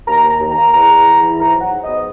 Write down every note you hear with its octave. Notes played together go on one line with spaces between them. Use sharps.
D#2 A#5
D#2
A#5
D#2
A#3 A#5
E2 A#5
E2
E2
E3
G#2 A#5
F#3
F#5
G#2
D#5
B3